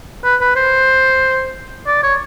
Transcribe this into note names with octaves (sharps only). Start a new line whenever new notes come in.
B4
B4
C5
D5
C#5